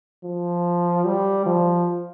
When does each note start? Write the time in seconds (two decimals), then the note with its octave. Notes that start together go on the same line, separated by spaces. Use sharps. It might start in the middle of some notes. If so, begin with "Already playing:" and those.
0.24 F3
1.05 G3
1.46 F3